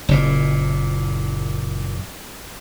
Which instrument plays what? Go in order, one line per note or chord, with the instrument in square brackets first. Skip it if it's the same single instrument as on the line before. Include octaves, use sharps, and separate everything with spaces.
[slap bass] F#1 A#2